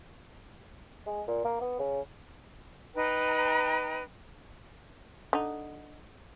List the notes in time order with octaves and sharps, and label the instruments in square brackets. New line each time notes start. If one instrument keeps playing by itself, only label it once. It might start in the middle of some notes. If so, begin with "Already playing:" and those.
[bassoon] G#3
A#2
A#3
B3
C#3
[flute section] D#4 B4 G5 A#5
[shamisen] D3 D#4